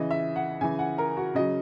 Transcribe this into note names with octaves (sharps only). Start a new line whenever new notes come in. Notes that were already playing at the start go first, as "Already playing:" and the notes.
Already playing: C#3 E3 D#5
E5
F#5
C#3 E3 G#5
F#5
A#4
F#4
C#3 F#3 D#5